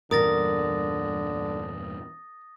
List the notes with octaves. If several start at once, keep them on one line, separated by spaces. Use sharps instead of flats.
E2 G2 A#2 D3 A#4 D#6 A6 A#6